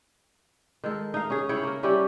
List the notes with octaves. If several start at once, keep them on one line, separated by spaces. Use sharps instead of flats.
D#3 G#3 A4
D#4 F5
C#4 G#4
C#3 E4 C#5 G5
A#3 A#4
G3 C#4 E4 G4